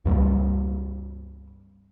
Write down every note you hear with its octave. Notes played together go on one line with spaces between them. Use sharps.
C#2 G2 G3 A#3